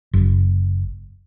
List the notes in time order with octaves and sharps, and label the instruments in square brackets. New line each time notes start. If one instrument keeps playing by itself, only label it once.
[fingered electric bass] F#1